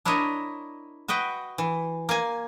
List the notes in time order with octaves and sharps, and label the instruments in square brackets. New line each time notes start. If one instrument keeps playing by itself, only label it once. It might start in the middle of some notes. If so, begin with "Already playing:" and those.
[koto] D4 E4 A#4 C#5 D#5
F#4 B4 D#5 G5
E3
A#3 G#5